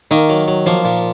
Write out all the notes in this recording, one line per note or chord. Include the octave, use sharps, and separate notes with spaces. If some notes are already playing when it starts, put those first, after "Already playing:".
D#3 A#3
F#3
F#3
F3 A#3
A#2